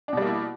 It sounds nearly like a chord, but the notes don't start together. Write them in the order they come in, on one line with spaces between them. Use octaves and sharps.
D4 B2 G3 A#3 E4